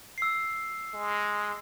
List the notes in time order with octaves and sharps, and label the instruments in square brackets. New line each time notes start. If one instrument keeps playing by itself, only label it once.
[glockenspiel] E6 C7
[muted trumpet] G#3